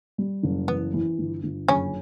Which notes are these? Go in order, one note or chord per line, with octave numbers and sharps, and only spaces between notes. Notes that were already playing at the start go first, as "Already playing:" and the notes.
G3
F#1
E3 B3
E3
G1
G1
F#1 C#3 C#4